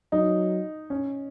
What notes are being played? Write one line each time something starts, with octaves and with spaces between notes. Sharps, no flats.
F#3 D#4
C#4